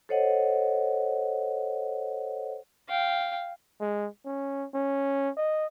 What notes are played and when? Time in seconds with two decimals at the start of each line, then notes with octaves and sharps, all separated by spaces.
0.09 A4 C5 C#5 D#5 F#5
2.89 F5 G5
3.80 G#3
4.25 C#4
4.74 C#4
5.37 D#5